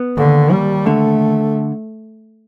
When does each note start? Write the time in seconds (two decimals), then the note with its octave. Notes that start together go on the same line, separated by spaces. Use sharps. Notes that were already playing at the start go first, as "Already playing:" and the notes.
Already playing: B3
0.17 D#2 D3
0.52 D#2 G3
0.86 D3 A3